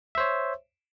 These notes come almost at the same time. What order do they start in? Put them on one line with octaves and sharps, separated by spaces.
E5 C5 C#5